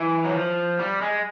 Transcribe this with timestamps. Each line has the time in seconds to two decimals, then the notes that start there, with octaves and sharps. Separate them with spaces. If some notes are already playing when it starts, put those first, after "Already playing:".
Already playing: E3
0.25 F#3
0.33 F3
0.79 G3
1.01 G#3